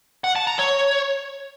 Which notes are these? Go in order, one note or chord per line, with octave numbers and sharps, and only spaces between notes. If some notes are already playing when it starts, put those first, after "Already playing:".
F#5
A5
A#5
C#5